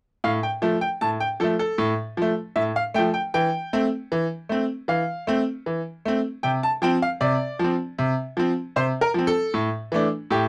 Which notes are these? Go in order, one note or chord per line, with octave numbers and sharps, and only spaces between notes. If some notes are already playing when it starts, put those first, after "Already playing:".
A2 F5
G5
F3 A3
G5
A2 A5
G5
F3 A3 A4
A4
A2
F3 A3
A2 E5
F5
F3 A3 G5
G5
E3 G5
A3 C4
E3
A3 C4
E3 F5
A3 C4
E3
A3 C4
C3 G5
A5
F3 C4 G5
F5
C3 D5
F3 C4
C3
F3 C4
C3 C5
A#4
F3 C4
A4
A2
E3 A3 D4
A2 G4